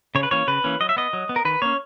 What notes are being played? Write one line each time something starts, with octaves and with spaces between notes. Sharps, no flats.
C#3 C#5
B4
E3 A#3 C#4 C#5
C#3 B4
E3 A#3 C#4
F#3 D#5
E5
B3 D#5
F#3
B3
A#4
D#3 B4
A#3 C#4 C#5